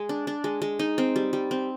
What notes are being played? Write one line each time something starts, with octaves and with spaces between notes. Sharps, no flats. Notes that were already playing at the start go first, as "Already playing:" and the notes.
Already playing: G#3
D4
D4
G#3
G#3
D#4
C4
G3
G3
C4